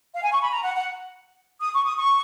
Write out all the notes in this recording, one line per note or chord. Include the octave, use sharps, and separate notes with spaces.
F5
G#5
C#6
B5
A#5
F#5
F#5
D#6
C#6
D#6
C#6